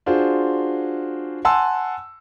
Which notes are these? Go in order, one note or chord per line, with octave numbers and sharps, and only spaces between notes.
D4 F4 F#4 G#4 C5
F#5 G#5 A5 C6 E6